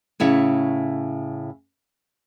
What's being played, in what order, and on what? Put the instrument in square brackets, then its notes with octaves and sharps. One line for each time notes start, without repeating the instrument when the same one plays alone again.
[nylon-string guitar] A2 C#3 E4 C#5